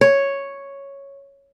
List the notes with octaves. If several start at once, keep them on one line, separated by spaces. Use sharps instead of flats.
C#5